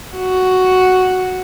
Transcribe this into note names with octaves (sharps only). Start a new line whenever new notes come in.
F#4